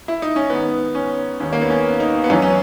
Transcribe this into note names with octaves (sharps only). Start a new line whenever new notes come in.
E4
D#4
C#4
G#2 D#3 B3
C#4
D#2 D#3 C#4
A#3
B3
C#4
D#4
B3
F#2 E3 C#4
C#4